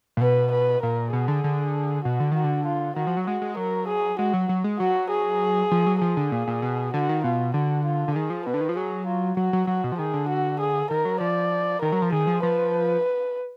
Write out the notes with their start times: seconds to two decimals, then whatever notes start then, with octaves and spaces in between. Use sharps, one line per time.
0.17 A#2
0.21 B2 B4
0.52 B4
0.82 A#2 A#4
1.13 B2 G#4
1.28 D3
1.44 D3
2.04 B2 F#4
2.20 D3
2.32 D#3 F#4
2.44 D3
2.66 F4
2.96 D#3 F#4
3.07 F3
3.17 F#3
3.27 G#3 F#4
3.42 G#3
3.57 F#3 A#4
3.88 G#4
4.19 G#3 F#4
4.33 F#3
4.49 F#3
4.64 G#3
4.79 F#3 F#4
5.10 G#4
5.71 F3
5.86 F#3
6.01 F3 G#4
6.17 D3
6.32 A#2
6.47 A#2
6.62 B2
6.93 D3 F#4
7.09 D#3
7.24 B2 F4
7.54 D3 F#4
7.85 F4
8.08 D3
8.15 D#3 G#4
8.30 F3
8.46 B2 B4
8.54 D3
8.61 D#3
8.69 F3
8.76 F#3 G#4
9.07 F4
9.37 F#3 F#4
9.53 F#3
9.67 F#3 F#4
9.84 B2
9.92 F3
9.98 D#3 G#4
10.14 D3
10.29 F#4
10.60 G#4
10.90 D#3 A#4
11.05 F#3
11.20 F3 D5
11.82 D#3 A#4
11.92 F#3
12.02 F3
12.12 D#3 G#4
12.27 F3
12.43 F3 B4